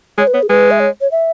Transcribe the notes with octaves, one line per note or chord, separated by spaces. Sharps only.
G#3 C#5
B4
B3 C#5
G#4
G#3 B4
E5
C#5
C#5
E5